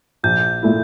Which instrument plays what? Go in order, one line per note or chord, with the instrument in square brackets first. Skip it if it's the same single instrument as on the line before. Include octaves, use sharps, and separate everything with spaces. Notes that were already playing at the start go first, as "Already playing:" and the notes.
[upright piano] A#1 [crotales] G6
[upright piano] A#2 A3 E4